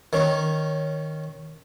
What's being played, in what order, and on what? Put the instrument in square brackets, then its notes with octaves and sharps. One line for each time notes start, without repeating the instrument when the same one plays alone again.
[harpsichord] D#3 C#4